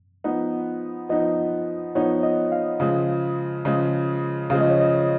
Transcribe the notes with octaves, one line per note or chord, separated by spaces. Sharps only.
F3 B3 D#4
F3 B3 D#4 D#5
F3 B3 D#4 C#5
D#5
F5
C#3 F3 G#3
C#3 F3 G#3
C#3 F3 G#3 F5
D#5
C#5
D#5